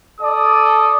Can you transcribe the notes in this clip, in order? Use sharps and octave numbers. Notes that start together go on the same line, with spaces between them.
A4 D5 D#6